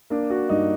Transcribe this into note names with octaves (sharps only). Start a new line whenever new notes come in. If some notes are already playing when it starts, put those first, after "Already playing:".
A#3 D4
F#4
G2 D#4